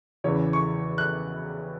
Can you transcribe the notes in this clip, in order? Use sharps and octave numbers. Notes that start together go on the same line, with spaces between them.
E2 C#3 E3 C#5
C#6
F#6